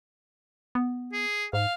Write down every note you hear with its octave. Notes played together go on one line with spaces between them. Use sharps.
B3
G#4
G#2 F5